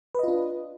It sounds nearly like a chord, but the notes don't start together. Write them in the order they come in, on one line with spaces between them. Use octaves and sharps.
B4 D#5 F4 D4